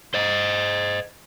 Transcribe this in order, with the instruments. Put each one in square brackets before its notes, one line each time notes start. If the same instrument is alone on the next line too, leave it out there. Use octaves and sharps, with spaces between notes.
[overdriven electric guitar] C5 D#5